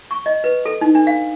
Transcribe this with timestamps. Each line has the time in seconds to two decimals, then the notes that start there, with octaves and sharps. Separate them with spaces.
0.11 C#6
0.26 D#5
0.44 B4
0.65 A4
0.81 D#4
0.95 D4
1.07 F5